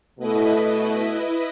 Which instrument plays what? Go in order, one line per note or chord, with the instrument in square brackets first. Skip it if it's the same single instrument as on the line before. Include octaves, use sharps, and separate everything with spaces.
[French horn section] B2 A3 [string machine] E4 B4 D#5